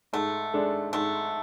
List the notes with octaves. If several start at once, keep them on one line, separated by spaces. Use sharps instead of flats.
G#2 A3
G#3 D4 A4
G#2 A3